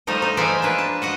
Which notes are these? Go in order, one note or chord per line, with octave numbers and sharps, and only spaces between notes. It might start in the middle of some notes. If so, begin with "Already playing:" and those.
F3 G3 A3 D#4 D#5
D#4
E3 F3 G#3 D5 E5 G#5
A#3 D4 B4
A5
F#4 D#5 F#5